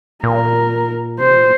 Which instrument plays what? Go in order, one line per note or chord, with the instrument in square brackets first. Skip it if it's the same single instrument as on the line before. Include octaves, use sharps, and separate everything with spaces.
[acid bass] A#2 [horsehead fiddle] A#4
[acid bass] C3 [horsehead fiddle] C5
[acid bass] A#2